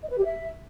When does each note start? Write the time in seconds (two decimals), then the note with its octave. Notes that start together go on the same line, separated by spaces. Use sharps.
0.02 D#5
0.09 B4
0.17 G4
0.24 E5